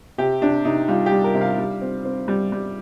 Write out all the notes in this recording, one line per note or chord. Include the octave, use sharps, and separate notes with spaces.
C3 G4
C3 D4
C3 D#4
G3 F4
G4
G3
A#4
C3
F5
G3
C4
C4
G3
G3